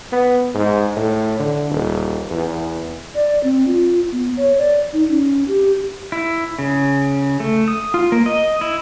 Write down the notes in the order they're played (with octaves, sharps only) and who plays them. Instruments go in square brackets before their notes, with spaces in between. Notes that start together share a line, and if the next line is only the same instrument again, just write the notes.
[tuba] B3
G#2
A2
D3
D#1
E2
[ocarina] D5
C4
F4
B3
C#5
D5
D#4
C#4
G4
[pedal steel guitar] E4
C#3
A3
D#6
F4
A#3
D#5
E4